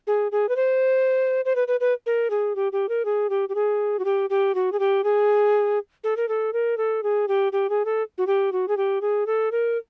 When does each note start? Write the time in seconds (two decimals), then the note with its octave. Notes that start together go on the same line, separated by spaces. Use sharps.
0.07 G#4
0.32 G#4
0.49 B4
0.56 C5
1.45 C5
1.56 B4
1.68 B4
1.80 B4
2.06 A#4
2.30 G#4
2.56 G4
2.72 G4
2.89 A#4
3.05 G#4
3.30 G4
3.49 G4
3.55 G#4
3.99 F#4
4.05 G4
4.30 G4
4.55 F#4
4.72 G#4
4.79 G4
5.04 G#4
6.04 A4
6.17 A#4
6.28 A4
6.53 A#4
6.77 A4
7.03 G#4
7.28 G4
7.52 G4
7.70 G#4
7.85 A4
8.18 F#4
8.27 G4
8.52 F#4
8.68 G#4
8.77 G4
9.01 G#4
9.26 A4
9.51 A#4